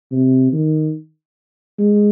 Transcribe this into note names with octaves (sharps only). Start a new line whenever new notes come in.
C3
D#3
G#3